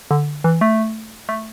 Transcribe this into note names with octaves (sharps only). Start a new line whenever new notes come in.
D3
E3
A3
A3